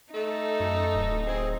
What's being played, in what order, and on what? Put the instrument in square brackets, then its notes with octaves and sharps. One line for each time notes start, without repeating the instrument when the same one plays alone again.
[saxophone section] A3 A4 [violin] D#4
[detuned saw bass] F#2
D1
[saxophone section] C4 G#4